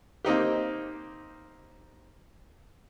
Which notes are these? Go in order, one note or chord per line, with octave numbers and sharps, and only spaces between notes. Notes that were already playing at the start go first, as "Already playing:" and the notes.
A#3 C4 D#4 G4